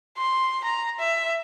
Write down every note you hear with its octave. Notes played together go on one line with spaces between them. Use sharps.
C6
A#5
E5